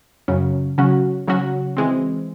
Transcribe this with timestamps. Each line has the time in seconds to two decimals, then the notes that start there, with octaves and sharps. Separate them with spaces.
0.28 F#2 C#3 F#3 C#4
0.78 C#3 F#3 C#4 F#4
1.27 C#3 F#3 C#4 F#4
1.77 E3 G#3 C4